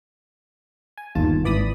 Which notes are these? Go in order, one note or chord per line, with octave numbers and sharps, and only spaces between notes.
G#5
G1 D#2 F4 A5
G#1 E3 D5 B5 D#6